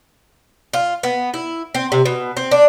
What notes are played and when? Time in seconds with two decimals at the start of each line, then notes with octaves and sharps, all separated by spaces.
0.73 F4
1.03 B3
1.34 E4
1.75 C4
1.92 C3
2.05 B2
2.37 C4
2.51 D4